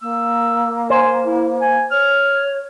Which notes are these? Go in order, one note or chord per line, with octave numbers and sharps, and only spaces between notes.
A#3 E6
C5 G#5
E4
G#5
C#5 F6